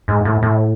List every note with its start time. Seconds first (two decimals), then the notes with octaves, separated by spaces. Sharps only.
0.08 G#2
0.25 A2
0.43 A2